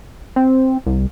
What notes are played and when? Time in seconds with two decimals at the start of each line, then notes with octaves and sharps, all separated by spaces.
0.36 C4
0.87 C2